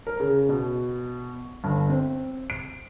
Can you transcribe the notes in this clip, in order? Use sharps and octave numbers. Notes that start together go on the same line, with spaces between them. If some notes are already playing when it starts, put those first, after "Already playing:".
A#4
C#3
B2
G1
C4
D7